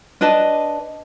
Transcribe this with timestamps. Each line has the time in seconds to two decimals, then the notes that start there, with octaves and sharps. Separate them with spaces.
0.21 D4 B4 D#5 A5